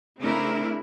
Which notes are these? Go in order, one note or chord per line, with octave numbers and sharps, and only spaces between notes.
C#3 A3 C4 D4 E4 A#4